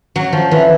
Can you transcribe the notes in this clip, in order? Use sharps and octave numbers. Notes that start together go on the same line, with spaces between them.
F#3
F3
E3